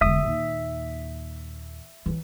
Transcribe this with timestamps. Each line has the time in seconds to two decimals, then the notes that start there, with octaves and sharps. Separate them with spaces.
0.01 E1 D3 E5 D#6
0.23 D#2 A#2
2.06 E3 F#3